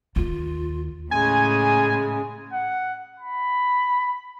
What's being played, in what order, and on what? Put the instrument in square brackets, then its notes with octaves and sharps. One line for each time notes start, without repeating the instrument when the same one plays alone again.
[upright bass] D#2 [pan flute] F4
[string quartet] A2 C#3 G#3 [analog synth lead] G#5
[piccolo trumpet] F#5
B5